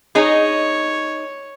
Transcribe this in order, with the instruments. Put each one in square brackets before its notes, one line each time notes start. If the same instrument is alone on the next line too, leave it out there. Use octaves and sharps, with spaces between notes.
[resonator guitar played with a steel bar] D#4 G#4 [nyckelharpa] C#5